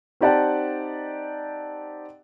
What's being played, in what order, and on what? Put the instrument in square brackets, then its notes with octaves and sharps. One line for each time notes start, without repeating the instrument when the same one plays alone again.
[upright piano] C4 D#4 G4 D5 F#5 A5